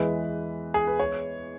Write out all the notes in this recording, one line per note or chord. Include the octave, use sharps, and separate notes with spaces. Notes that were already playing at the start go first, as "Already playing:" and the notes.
Already playing: E2 E3 G#3 B4
G#4
B4
C#5